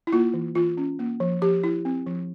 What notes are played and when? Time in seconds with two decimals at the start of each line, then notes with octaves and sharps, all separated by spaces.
0.07 E4
0.12 A#3 F4
0.34 E3
0.55 E3 F4
0.77 C#4
0.99 A#3
1.20 F3
1.42 F3 G4
1.64 E4
1.85 C4
2.06 F3